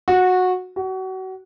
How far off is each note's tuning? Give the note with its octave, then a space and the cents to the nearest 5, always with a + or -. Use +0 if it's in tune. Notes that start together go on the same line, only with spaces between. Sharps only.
F#4 -15
F#4 +30